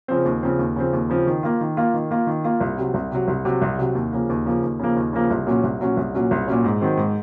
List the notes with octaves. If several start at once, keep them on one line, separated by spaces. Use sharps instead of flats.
C#3 F3 C4
D#2
C#3 F3 C4
D#2
C#3 F3 C4
D#2
C#3 F3 C4
D#3
A#3 F4
D#3
A#3 F4
D#3
A#3 F4
D#3
A#3 F4
C2
C3 F#3
C2
C3 F#3
C2
C3 F#3
C2
C3 F#3
D#2
C#3 F3 A#3
D#2
C#3 F3 A#3
D#2
C#3 F3 A#3
D#2
C#3 F3 A#3
C2
A#2 F#3 C#4
C2
A#2 F#3 C#4
C2
A#2 F#3 C#4
C2
A#2 F#3 C#4
G#2
D#3 F#3 C4
G#2